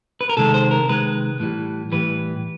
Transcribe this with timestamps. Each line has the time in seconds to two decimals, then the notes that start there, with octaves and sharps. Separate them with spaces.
0.21 B4
0.29 A#4
0.37 C3 D#3 G#3 A4
0.54 C5
0.71 A#4
0.89 C3 D#3 G#3 B4
1.40 A2 E3 G3
1.92 A2 E3 G3 B4